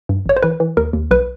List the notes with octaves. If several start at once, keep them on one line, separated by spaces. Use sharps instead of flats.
G2
A1 C#5
C5
E3 B4
E3
D#2 A#4
D#2
B1 B4